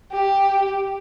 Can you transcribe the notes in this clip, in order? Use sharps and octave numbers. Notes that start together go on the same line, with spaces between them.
G4